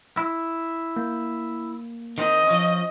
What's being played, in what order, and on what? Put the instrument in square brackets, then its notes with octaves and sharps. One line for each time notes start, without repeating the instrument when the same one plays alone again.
[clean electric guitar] E4
[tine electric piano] A#3
[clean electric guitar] D#3 C4 [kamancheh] D#5
[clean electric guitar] F3 C#4